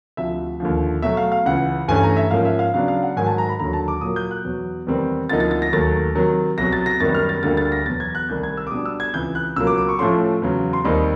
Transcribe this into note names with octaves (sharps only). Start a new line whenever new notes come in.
D2 C3 F3 E5
D#2 D3 F3
B2 F#3 A3 E5
F5
F5
C#2 C#3 E3 F#5
G2 E3 A3 C#4 G#5
A#5
E5
G#2 F3 A#3 C#4 F5
E5
F5
C#3 F#3 B3 D4 F5
F5
F#5
G#2 D#3 F#3 G#5
A5
A#5
B5
D#2 D3 F#3 A#5
A5
D6
A#2 F#3 A#3 D#6
G6
F#6
E2 B2 F#3
E2 C3 D#3 G3 C4
D2 C3 F3 A#3 D#4 A6
A6
A6
A#6
D#2 D#3 F#3 A3 A6
C3 D#3 F#3
C2 B2 F#3 B3 A#6
A6
A#6
F#2 D#3 G3 B3 A6
F6
A6
D2 D3 G3 A#3 A6
A6
A#6
E2 B2 F#3 A6
G#6
F#6
C2 C3 D#3 G3 G6
G#6
E6
D6
B2 G3 B3 D4 D#6
E6
G#6
C#2 C3 E3 G6
F#6
C#2 B2 F#3 A#3 E6
D6
D6
C#6
A2 F3 A3 C#4 C6
E2 C#3 F#3
C6
D#2 D#3 G3 C4 D#4 B5